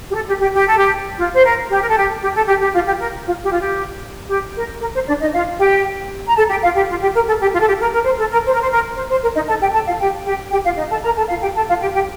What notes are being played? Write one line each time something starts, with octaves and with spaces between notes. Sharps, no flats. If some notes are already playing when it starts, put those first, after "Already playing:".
G4
A4
G4
G4
G4
A4
G4
F4
C5
A#4
G4
A#4
A4
G4
G4
A4
G4
G4
F4
G4
A#4
F4
G4
F4
G4
G4
A#4
A#4
C5
D4 D5
D#4 D#5
F4 F5
G4 G5
A#5
A4 A5
G4 G5
F4 F5
G4
F4
G4
A#4
A4
G4
F4
A4
G4
A#4
A#4
C5
A4
A#4
C5
A#4
C5
A#4
C5
C5
A#4
D#4 D#5
A4 A5
G4 G5
A4 A5
F4 F5
G4 G5
G4 G5
G4 G5
F4 F5
D#4 D#5
A4 A5
A#4 A#5
A4 A5
F4 F5
G4 G5
A4 A5
F4 F5
G4 G5
G4 G5